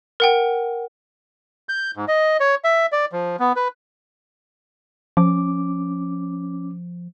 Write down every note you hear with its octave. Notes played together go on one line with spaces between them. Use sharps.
A#4 F#5 G5
G6
G#2
D#5
C#5
E5
D5
F3
B3
B4
F3 C#4 D6